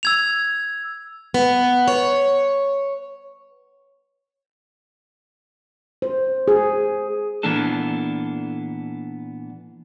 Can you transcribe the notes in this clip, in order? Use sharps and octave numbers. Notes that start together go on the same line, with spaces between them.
E6 G#6 F7
B3
C#5
C5
G#4
A#2 E3 A#3 B3 D4 A4